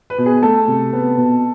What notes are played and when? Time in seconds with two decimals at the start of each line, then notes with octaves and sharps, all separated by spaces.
0.10 B4
0.18 B2
0.26 G#4
0.42 A3 A4
0.68 C3
0.93 B3
1.17 B2